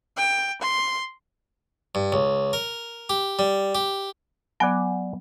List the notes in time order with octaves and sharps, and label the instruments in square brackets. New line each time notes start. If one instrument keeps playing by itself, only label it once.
[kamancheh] G5
C6
[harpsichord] G2
C#2
A#4
G4
G3
G4
[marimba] F#3 B3 [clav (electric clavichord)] D5 F#5 G#5